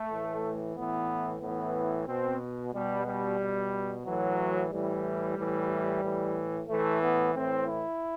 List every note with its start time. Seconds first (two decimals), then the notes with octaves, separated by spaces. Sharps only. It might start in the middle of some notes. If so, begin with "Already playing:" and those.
Already playing: A3
0.09 A2 E3
0.75 A2 E3 B3
1.41 A2 E3 B3
2.06 B2 C4
2.73 B2 G3
3.06 G3
3.39 B2
4.05 A2 E3 F#3
4.70 A2 E3 G3
5.36 A2 E3
6.03 A2 E3
6.67 A2 E3 A3
7.01 B3
7.34 A2 E3 C4
7.67 E4